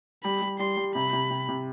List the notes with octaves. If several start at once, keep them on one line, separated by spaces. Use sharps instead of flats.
G3 B5
G3
G3 C6
G3
C3 B5
C3
C3
C3